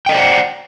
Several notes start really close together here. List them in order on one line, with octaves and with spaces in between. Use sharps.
G5 D#5 D5 C5 F#5